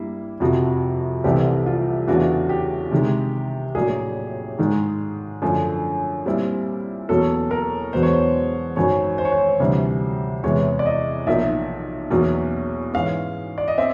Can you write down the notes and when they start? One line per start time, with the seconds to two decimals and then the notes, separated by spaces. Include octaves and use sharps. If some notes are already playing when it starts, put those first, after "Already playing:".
Already playing: G2 G3 A#3 E4
0.40 F2 C3 F3 F#4
1.24 C2 C3 E3 A3 C4 G4
1.66 F4
2.08 E2 C#3 E3 A3 D4 F#4
2.49 G4
2.91 C3 D#3 G#3
3.75 A#1 A2 F#3 A#3 G#4
4.58 G#2 D#3 G#3
5.42 F#2 D3 F3 A3
6.26 A#2 G3 C4 E4
7.09 E2 B2 F#3 A#3 C#4 A4
7.51 A#4
7.93 E1 E2 B2 F#3 B3 C5
8.03 C#5
8.13 C5
8.76 G#1 F#2 D#3 F#3 C#5
9.18 C5
9.25 C#5
9.32 C5
9.59 D2 C3 E3 G3
10.43 E2 C3 E3 G#3 C#5
10.79 D5
10.86 D#5
11.27 B1 A#2 F3 A#3 D#4 E5
12.10 E2 B2 F#3 A#3 C#4
12.94 G#2 E3 G#3 C#4 F5
13.58 D5
13.68 D#5
13.78 C4 E5